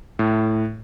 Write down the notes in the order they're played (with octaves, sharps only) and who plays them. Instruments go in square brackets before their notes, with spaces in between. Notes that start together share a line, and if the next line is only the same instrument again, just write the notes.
[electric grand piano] A2